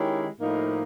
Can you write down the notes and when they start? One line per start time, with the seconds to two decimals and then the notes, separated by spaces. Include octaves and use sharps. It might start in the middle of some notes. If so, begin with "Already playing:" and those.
Already playing: D#3 G#3 C#4 E4 G4
0.41 A2 F3 A#3 D#4